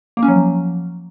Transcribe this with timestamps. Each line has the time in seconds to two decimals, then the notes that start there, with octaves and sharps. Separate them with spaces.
0.17 A#3
0.23 C#4
0.28 F#3
0.34 F3